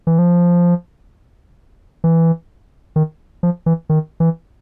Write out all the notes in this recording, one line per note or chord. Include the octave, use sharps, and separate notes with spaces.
E3
F3
E3
D#3
F3
E3
D#3
E3